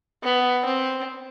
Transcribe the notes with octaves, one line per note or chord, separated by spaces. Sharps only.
B3
C4